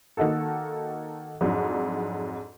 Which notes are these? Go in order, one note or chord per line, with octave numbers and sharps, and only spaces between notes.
D#3 A#3 D#4 F#4 A4
F2 G#2 F#3 D4